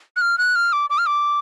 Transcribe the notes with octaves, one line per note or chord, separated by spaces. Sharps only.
F#6
F6
F#6
F6
D6
D6
F6
D6